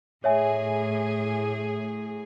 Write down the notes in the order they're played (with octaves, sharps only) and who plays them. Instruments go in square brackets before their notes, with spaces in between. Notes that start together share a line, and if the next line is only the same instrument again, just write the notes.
[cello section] A2 G#4 [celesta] C#5 E5 G#5